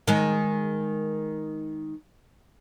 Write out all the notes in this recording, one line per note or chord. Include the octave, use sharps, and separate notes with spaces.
D#3 G#3